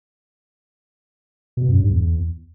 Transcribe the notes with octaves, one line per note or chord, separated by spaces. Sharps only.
B2
F#2
G2
E2